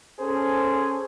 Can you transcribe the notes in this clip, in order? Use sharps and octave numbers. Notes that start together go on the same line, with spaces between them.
C#4 G#4 A4 C5